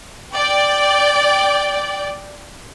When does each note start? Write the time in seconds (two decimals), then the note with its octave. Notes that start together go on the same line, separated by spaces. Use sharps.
0.33 D5 G5